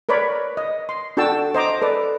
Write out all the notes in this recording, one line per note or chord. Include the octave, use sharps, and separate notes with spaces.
A#4 B4 C#5 D5 B5
D#5
C6
D4 F#4 A4 G5 A5 E6
C5 D#5 A#5 D6
A4 B4 D5